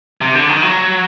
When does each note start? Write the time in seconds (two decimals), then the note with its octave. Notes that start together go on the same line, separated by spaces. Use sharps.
0.21 C3
0.35 D3
0.49 D#3
0.62 F#3